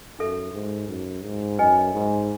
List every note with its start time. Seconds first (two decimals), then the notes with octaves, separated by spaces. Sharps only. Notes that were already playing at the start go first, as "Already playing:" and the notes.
0.18 F#2 D#4 A4 E5
0.53 G#2
0.88 F#2
1.24 G#2
1.59 F#2 B4 D#5 G#5
1.94 G#2